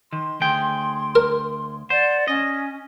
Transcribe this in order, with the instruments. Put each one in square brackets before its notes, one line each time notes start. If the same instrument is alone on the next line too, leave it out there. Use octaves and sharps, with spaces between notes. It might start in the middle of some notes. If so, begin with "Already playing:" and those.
[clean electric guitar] D#3 [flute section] C6
[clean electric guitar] D2 G#4 G5
[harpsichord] A#4
[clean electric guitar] C5 [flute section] D5 F#5
[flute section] C#4 [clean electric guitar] D#5